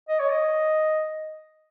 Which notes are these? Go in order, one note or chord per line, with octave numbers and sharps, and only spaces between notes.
D#5
C#5
D#5